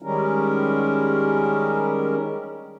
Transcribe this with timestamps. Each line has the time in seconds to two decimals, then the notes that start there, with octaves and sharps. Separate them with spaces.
0.02 D#3 G3 G#3 C#4 A#4